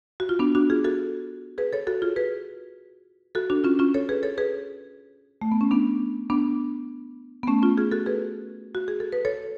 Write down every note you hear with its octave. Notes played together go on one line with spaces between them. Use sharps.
F#4
F4
B3 D4
D4 F#4
F4 G#4
F#4 A4
G#4 B4
A4 C#5
F#4 A4
F4 G#4
G#4 B4
F#4 A4
D4 F#4
C#4 F4
C#4 F4
A4 C#5
G#4 B4
A4 C#5
G#4 B4
A3
B3
C#4
B3 D4
B3 D4
B3
A3 C#4
C#4 F4
F4 G#4
F#4 A4
G#4 B4
F#4
G#4
A4
B4
A4 C#5